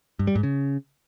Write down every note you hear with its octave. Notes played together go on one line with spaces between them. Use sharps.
G2
G3
G#2
C#3